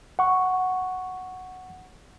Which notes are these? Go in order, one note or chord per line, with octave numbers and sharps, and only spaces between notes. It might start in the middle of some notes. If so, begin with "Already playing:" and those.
F#5 C#6